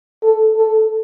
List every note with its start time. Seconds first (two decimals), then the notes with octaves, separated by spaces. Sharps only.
0.22 A4
0.57 A4